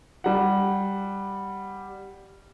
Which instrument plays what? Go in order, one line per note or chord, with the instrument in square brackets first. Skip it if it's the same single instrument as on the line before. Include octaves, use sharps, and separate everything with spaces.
[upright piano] G3 F#5